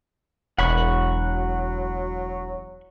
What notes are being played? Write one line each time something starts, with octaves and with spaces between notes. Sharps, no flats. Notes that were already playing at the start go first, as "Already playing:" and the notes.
E1 F#3 F#5 B5 C#6